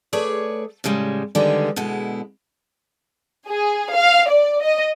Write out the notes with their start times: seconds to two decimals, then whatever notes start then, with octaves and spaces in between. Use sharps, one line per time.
0.13 A3 G#4 B4 C#5 D5
0.84 A2 C#3 G3 G#3
1.35 D3 D#3 G3 G#3 B3 G#4
1.76 B2 D3 G#3 E4
3.48 G#4
3.95 F5
4.29 D5
4.62 D#5